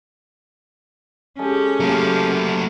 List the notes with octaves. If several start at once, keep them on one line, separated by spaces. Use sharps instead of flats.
G#3 C#4 G4 A4
F#3 A3 A#3 G4 F5